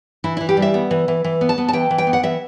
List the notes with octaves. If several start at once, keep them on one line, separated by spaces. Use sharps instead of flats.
E3 E4
E3 E4
G4
G3
E5
B3
E3
E3
E3
B3
A5
B3
A5
E3 G5
E3
G5
B3
F#5
E3 E5